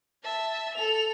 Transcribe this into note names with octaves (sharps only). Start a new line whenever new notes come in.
E5 A5
A4 F7